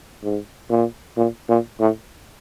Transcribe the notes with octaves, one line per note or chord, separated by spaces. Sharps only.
G#2
A#2
A#2
A#2
A2